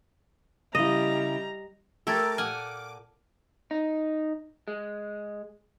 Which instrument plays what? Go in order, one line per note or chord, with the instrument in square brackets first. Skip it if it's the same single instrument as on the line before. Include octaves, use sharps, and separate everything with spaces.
[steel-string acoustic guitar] C#3 E4 [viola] G3 A#5 [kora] D#5
[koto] A3 G4 [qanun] A4 [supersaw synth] A#4 D6 [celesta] E6 G#6 A6
[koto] A#2 F#5 G#5 [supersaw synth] D6 [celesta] F6
[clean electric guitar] D#4
G#3